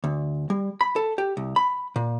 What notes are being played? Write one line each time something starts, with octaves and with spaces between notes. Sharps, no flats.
D2
G3
B5
A4
G4
C2
B5
A#2